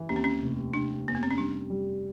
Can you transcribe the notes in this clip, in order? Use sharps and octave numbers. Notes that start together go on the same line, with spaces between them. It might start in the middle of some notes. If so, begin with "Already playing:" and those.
Already playing: E3
D#2 C#4
C4
C#4
F1
F1 D4
F1 A#3
B3
C4
C#4
G3 D4
G3